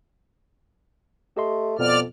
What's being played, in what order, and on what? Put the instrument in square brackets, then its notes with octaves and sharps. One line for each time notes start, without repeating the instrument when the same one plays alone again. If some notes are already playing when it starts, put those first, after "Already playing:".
[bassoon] A3 [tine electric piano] G4 D#5 C6
[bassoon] F2 [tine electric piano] B2 B3 [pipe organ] D5 F6